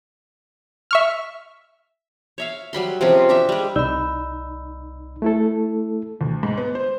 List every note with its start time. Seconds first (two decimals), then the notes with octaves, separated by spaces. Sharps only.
0.91 E5 C#6 F6
2.38 C#5 E5 F5
2.73 F#3 G3 B5 C6
3.01 C3 F3 G#3 C#4
3.29 D4 G4 E5
3.49 G3 G#3
3.76 C2 D#4 D5 B5 E6
5.22 A3 E4 A4
6.21 D2
6.43 G#2
6.58 B3
6.75 C5